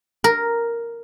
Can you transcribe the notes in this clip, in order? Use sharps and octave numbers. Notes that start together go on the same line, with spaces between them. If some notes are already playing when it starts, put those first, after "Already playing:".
A#4